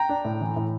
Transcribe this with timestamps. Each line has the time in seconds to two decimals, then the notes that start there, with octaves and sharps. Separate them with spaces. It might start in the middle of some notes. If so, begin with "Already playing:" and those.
Already playing: G5 A#5
0.09 D4
0.25 A2
0.41 E3
0.56 A2